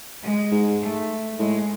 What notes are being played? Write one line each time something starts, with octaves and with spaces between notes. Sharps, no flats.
G#3
G#2
A3
A2 G#3